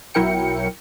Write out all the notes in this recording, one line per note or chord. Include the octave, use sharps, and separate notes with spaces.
B1 F#3 E4 A#4 G5 C#7